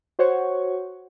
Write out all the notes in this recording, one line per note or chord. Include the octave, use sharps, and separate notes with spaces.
F#4 C5 C#5 F#5 C#6